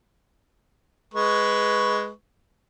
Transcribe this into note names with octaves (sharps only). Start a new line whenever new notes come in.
G#3 B4 C#6